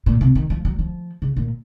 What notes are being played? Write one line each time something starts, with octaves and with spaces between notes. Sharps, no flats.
A#2
C3
D#3
F3
F#3
F3
C#3
A#2